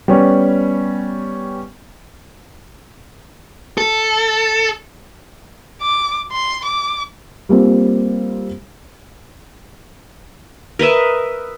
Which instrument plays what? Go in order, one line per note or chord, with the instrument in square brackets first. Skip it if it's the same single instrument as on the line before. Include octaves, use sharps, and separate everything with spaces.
[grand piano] G3 B3 C#4
[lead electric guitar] A4
[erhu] D6
C6
D6
[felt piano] G3 A#3 C4 F4
[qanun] A#4 B4 D#5 E5